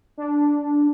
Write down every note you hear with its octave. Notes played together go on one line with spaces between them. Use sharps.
D4